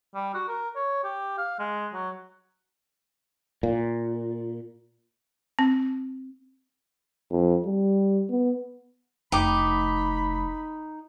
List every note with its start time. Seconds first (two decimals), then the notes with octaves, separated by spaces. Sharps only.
0.15 G3
0.34 F#4
0.48 A#4
0.76 C#5
1.04 G4
1.38 F5
1.59 G#3
1.93 F#3
3.63 A#2
5.59 C4
7.31 F2
7.66 G3
8.29 B3
9.32 F1 D#4 G5 B5 D6